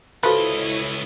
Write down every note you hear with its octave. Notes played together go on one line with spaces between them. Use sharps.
C#2 F3 E4 F#4 A4 B4 C#5 D#5